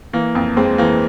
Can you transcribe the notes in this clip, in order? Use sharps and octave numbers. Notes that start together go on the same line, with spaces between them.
E3 A#3
F2 A#3
F2 G#3 C4
E3 A#3